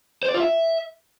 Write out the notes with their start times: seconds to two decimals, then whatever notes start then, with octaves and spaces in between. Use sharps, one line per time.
0.23 C5
0.28 D5
0.34 F4
0.40 E5